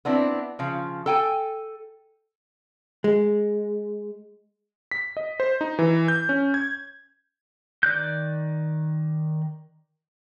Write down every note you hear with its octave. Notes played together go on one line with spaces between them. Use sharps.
B3 C4 D4 E4
C#3 F3
A4 G5 G#5
G#3
B6
D#5
C5
D#4
E3
G6
C#4
G#6
D#3 D5 F#6 G6